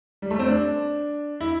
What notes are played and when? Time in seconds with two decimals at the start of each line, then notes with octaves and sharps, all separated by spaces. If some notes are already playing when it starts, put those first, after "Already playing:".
0.22 G3
0.30 A3
0.39 C4
0.48 D4
1.41 E4